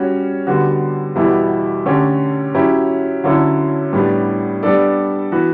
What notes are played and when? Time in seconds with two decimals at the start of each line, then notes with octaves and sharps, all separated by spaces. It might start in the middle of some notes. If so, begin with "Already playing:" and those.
Already playing: G3 C#4 F#4 C#5
0.47 D3 G3 B3 F#4
1.16 E2 B2 G3 B3 E4
1.86 D3 A3 C#4 G4
2.55 F#3 C#4 E4 G4
3.24 D3 F#3 C#4 E4 A4
3.93 A2 G3 B3 D4
4.63 G3 B3 D4 A4 D5
5.32 E3 B3 F#4 B4